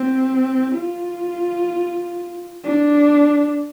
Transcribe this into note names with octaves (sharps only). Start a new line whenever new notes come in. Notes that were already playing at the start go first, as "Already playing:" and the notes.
Already playing: C4
F4
D4